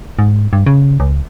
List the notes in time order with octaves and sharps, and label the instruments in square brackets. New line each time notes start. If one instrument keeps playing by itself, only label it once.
[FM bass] G#2
G2
C#3
C#2